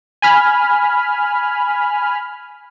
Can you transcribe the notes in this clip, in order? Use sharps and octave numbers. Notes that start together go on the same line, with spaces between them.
G#5 B5 F6